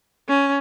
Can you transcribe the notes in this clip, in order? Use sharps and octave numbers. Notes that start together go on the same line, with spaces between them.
C#4